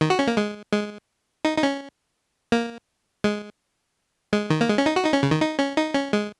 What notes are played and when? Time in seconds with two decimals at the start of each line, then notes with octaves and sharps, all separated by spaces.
0.01 D#3
0.10 F#4
0.19 C#4
0.27 A#3
0.37 G#3
0.72 G#3
1.45 D#4
1.58 D#4
1.63 C#4
2.52 A#3
3.24 G#3
4.33 G#3
4.50 D#3
4.61 A#3
4.68 G#3
4.78 C#4
4.86 D#4
4.96 F#4
5.04 D#4
5.13 C#4
5.23 C#3
5.31 D#3
5.41 D#4
5.59 C#4
5.77 D#4
5.94 C#4
6.13 G#3